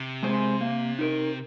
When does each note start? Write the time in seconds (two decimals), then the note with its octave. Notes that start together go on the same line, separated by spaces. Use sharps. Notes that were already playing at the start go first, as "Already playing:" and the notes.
Already playing: C3
0.23 G#3 C4 G#4 C5
0.61 A#3
0.99 D#4 A#4